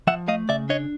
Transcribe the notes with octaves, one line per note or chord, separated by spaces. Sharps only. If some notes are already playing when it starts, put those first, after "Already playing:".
F3 E5 F#5
A3 D#5 F5
C#3 D5 E5
D4 C#5 D#5